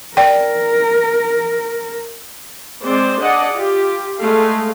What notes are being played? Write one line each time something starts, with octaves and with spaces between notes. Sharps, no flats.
A#4 D5 G5
G#3 C4 C5 D5
D4 G#4 D5 D#5 F#5
F4 G4
G#3 A3 F5